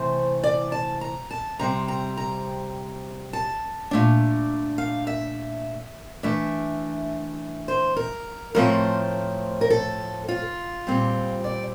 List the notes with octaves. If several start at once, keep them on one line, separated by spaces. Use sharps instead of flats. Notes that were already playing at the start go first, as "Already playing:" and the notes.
Already playing: C3 E3 A3 C5
D5
A5
A#5
A5
C3 G3 C4 A#5
A#5
A#5
A5
A#2 A3 D4
F5
E5
E3 A3 D4 E5
C5
A#4
A2 F3 A3 C4 A#4
A#4
A4
F4
A#2 G3 C4
D5